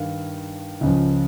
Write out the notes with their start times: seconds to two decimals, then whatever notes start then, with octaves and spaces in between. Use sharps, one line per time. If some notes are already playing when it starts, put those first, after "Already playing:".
Already playing: G2 D#3 F5
0.81 C#2 C#3 F3